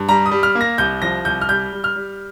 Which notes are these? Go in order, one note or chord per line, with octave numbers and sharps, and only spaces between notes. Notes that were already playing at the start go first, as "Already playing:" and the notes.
Already playing: G2
G3 A#5
D#6
G3
F6
A#3
A#6
C2 G6
F3 A#6
C2 G6
F6
G3 G6
G3
F6
G3